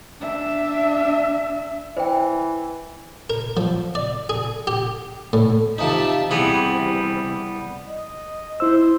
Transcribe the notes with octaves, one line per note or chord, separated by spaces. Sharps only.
D4 E5
E3 C5 G5
A#4
F3
D5
G#4
G4
A2
C3 F3 D#4 E5 A5
C2 C3 E3 G3 B3 G#4 F#5
D#5
E4 C5 E6